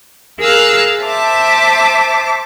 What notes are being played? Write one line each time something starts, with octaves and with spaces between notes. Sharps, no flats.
G#4 A#4 F5 E6 F#6
C5 E5 A5 D6